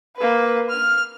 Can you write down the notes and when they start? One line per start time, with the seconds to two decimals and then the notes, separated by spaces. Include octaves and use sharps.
0.16 A#3 B4
0.69 F6